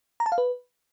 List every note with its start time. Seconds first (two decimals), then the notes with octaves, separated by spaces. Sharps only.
0.20 A#5
0.26 A5
0.32 F5
0.38 B4